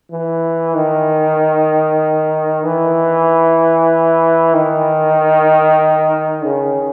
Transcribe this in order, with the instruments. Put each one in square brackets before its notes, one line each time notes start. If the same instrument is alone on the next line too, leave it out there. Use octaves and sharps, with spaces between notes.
[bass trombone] E3
D#3
E3
D#3
C#3